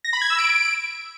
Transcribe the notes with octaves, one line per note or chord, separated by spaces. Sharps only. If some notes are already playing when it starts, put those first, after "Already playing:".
A#6
B5
G#6
E6
D7